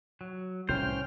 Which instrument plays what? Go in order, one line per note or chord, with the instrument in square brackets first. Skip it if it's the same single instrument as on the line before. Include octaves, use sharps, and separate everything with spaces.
[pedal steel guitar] F#3
[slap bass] C2 A2 E3 [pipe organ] C#4 G5 F6 [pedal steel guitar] C5